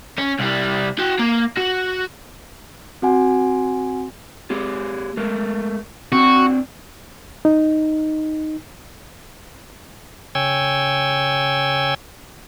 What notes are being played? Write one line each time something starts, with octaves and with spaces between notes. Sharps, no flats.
C#4
C2 G3
F#4 G5
A#3
F#4
C4 F#4 F#5 G#5
A#3 G4 G#4
G#3 A3 A#4
C4 D4 F#4
D#4
C#3 C#5 G5 G#5 E6